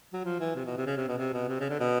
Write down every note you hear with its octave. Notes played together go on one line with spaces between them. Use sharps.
F#3
F3
E3
C3
B2
C3
C#3
C3
B2
C3
B2
C3
C#3
D3
B2